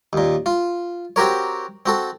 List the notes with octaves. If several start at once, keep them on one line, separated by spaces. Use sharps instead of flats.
D#2 A#2
F4
C4 F#4 G4 A#4 C#5
C4 F#4 A4